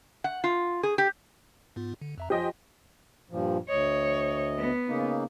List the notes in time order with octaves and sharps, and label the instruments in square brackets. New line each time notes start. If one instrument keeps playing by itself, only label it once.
[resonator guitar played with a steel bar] F#5
F4
G#4
G4
[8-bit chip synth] G#2 B3 F4
D3
F2 E5 A#5
[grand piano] F3 A#6 [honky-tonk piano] G4 D#5 G5 [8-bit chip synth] C5 G#5 C6
[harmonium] G2 A#2 F3
[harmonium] D2 D#5 [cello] C#5
[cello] B3
[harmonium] C#3 A#3 D#4